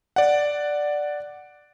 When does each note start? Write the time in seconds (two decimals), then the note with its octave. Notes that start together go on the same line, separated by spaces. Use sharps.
0.16 D5 F#5